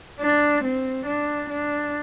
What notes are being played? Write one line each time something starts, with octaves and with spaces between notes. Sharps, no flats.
D4
C4
D4
D4